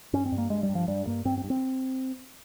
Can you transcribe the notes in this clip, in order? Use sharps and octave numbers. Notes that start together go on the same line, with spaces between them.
G2 C#4
C4
G2
A#3
G2 G#3
G3
G2
F3
G2 G3
G2 A#3
G2 C4
C4
G2
C4